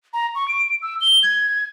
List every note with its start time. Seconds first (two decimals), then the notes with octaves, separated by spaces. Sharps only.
0.13 A#5
0.35 C#6
0.48 D7
0.82 E6
1.01 G7
1.23 G#6